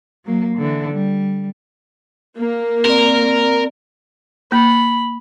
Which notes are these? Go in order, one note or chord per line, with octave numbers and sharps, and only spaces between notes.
F#3 A#3
D3 E3
G3
A#3
C4 A#4 D5
A#3 B5